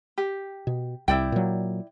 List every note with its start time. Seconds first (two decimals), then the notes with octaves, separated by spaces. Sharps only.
0.18 G4
0.67 B2
1.08 C2 E4 D5 G5
1.32 A#2 F#3